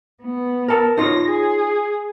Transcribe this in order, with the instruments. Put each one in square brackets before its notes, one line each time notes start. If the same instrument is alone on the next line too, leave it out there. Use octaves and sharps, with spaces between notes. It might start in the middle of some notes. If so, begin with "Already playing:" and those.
[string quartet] B3
[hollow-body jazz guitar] A#4 A5
[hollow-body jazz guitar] D#4 F4 C#5 [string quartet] A#6
[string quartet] G#4